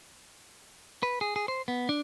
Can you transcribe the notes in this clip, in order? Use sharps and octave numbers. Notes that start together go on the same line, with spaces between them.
B4
G#4
G#4
C5
B3
D4